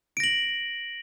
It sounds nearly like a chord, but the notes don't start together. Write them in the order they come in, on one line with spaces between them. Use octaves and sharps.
D7 A#6 F#7